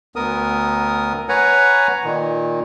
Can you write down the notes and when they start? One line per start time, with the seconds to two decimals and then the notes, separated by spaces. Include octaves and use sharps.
0.16 D2 B3 A#4 D#6
1.29 B4 C#5 F#5 G#5 A#5
2.04 A#2 D#3